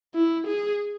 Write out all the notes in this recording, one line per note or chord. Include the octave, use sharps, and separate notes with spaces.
E4
G#4